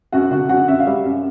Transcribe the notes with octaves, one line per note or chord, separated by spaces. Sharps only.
F#2 F#4 F#5
D3 F#4 F#5
F#2 F#4 F#5
F#2 E5
F5
G3 E5
F#2